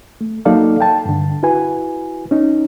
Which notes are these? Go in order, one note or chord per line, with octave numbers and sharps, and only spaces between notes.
A3
F#3 A#3 D#4 A4 D5 F5
G5 A5
G2 D3
E4 F#4 B4 G#5
C#4 D#4